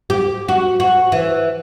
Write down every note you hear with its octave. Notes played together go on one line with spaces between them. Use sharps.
G4
F#4
F#4
E3